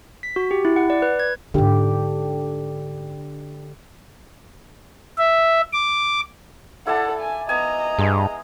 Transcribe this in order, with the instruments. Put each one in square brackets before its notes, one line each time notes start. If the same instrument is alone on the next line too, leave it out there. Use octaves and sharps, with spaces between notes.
[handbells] B6
F#4
G4
E4
F#5
D5
B4
G#6
[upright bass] G#2 D#4 [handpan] D3 G4
[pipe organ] E5
D6
[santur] E4 D5 A5 [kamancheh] A4 F#5
[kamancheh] G#5
[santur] B3 G#5 [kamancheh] D#5 A#5
[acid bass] G2 [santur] G#3